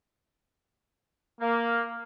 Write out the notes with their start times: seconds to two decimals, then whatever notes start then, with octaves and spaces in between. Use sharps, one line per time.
1.40 A#3